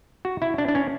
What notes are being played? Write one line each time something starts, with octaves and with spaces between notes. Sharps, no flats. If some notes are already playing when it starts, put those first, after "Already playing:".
F#4
E4
D4
D4
C#4